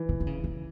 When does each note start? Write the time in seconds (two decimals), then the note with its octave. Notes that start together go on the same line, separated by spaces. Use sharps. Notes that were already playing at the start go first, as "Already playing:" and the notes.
Already playing: E3
0.09 C3
0.20 D3
0.27 C#3
0.44 C#3